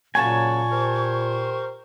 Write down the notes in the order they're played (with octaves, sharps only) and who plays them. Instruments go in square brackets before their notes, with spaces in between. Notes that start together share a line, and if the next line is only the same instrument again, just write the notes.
[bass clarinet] A#2 [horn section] C#3 F#3 A#3 [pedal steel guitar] G#5 A5 [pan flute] C#6
[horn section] G4 A#4 C5